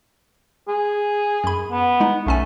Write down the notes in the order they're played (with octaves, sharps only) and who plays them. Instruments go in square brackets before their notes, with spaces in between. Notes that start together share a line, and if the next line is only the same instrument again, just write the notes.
[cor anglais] G#4
[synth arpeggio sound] F#2 B5
[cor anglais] B3
[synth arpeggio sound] G#3 D#4
[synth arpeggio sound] B1 C#4 G#5 [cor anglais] A3